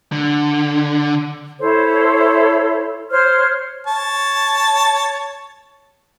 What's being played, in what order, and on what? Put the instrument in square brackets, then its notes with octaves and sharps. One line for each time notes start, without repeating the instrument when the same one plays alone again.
[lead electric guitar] D3
[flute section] E4 A4 C5 C#5
C5 C#5 F6
[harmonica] C#5 A5